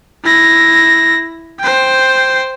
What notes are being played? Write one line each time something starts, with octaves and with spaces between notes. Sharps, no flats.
E4 A#6
C5 G5